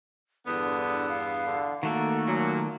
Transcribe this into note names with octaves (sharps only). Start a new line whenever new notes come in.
E2 G2 D3 B3 D#6
F5
D3
D#3 A3 A#3 F#4 A4
A#2 F#3